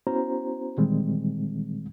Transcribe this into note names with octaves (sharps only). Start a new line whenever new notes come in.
B3 C#4 E4 F#4 C5 A#5
A#2 D#3 E3 G3 G#3 C4